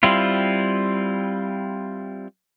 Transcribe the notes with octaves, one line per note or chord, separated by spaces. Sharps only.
G3 C4 E4 F4